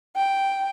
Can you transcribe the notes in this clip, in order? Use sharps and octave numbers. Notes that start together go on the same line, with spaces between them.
G5